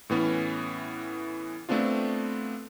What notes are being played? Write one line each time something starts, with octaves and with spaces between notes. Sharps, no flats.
A2 E3 B3 C#4
A3 B3 C4 D4 F4